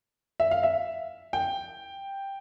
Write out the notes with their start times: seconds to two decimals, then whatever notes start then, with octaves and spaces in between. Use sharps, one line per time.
0.40 E5
0.51 F5
0.63 E5
1.33 G5